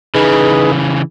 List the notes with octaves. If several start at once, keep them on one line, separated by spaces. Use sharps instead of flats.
C#3 E3 D#4 G#4 B4